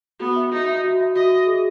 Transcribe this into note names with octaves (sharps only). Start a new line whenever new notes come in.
B3 F#4
E5
D#4 F#4
E5
F#4
E5
F#4 D#5
F#4
G#4